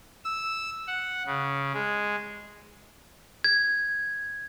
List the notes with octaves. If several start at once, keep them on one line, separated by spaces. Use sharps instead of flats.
E6
F#5
C#3
G#3
G#6